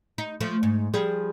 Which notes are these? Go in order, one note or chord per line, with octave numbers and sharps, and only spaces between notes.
D#4
F3 A3
G#2
F3 G3 G#4